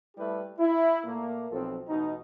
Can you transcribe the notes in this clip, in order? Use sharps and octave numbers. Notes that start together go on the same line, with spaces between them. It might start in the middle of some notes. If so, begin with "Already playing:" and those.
G3 A3 E4 G4 B4
E4
A#2 A3 A#3
B1 F3 C4 F4 A4
A1 B2 D#4